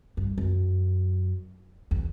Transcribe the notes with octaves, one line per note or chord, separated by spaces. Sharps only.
G2
F#2
E2